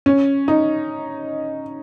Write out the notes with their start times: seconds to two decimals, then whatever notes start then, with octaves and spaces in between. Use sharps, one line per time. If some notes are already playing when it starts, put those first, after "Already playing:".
0.06 C#4
0.48 D#4